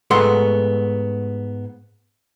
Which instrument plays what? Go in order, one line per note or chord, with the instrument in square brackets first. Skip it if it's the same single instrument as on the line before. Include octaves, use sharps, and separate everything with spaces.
[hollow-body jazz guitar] G#2 A3 B3 F#5 C6